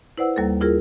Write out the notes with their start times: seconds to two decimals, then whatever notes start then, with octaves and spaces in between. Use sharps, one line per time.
0.17 E4 B4 C5 D5 F#5 E6
0.36 D#2 G3 A#3 A4
0.61 E4 F4 G#4 A#4